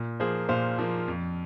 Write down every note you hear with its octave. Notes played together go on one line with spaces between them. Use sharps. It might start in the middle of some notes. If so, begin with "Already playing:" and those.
Already playing: A#2
F3 A#3 G#4 C5
A#2 C5 F5
F3 A#3
F2